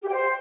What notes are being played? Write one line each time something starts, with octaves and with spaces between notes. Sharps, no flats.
G4
G5
C5